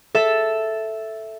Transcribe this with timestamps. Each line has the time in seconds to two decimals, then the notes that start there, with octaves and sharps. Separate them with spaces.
0.15 A4 E5